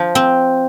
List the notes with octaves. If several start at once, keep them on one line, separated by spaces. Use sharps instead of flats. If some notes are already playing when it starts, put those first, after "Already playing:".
Already playing: F3
C4